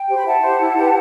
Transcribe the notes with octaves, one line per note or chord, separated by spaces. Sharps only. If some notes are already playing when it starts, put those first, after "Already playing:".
Already playing: G5
G4 C5
B5
E4 F#5 A5
G4 C5
E4
G4 B4